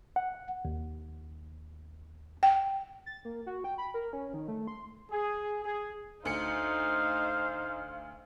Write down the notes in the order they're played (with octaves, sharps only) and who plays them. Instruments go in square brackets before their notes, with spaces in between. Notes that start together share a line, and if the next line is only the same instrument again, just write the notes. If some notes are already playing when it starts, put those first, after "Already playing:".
[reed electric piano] F#5
D#2
[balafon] G5
[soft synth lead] A6
A#3
F#4
G5
B5
A#4
C#4
D#3
A3
C6
[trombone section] G#4
G#4
[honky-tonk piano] D2 C#7 [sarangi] D#4 [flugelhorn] C5 [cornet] F5